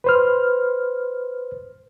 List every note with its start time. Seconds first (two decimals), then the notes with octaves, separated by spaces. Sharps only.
0.04 B4 C5 F6